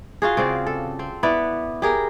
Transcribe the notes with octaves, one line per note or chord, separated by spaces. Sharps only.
F4 F#4 G#4
C#3 C4 D5
A4
C4
B3 E4 B4 D5
G4 G#4 A#4